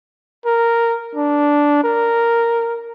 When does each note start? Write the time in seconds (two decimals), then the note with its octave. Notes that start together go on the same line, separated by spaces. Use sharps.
0.46 A#4
1.15 D4
1.84 A#4